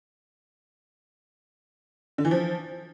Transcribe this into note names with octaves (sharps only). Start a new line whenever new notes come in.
D3
E3
F3